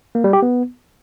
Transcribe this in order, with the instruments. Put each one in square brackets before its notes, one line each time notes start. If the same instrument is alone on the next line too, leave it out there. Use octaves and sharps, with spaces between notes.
[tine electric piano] A#3
G3
G4
B3